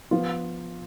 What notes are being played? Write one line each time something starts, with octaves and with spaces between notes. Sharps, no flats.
F3 B3 F4